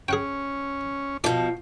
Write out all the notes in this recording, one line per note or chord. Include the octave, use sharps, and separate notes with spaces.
C#4 G#4 F#5 G5
B2 F3 D5